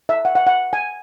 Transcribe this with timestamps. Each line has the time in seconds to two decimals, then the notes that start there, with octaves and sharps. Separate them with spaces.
0.09 E5
0.25 F#5
0.35 F#5
0.47 F#5
0.73 G#5